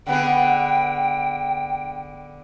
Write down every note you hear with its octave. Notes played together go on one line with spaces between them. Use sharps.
D3 B3 G#4 G5